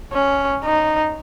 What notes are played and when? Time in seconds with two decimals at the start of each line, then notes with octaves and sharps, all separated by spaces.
0.13 C#4
0.64 D#4